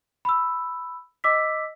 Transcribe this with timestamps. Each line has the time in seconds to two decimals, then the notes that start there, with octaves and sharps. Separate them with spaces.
0.25 B5 E6
1.24 D#5 D6 E6 B6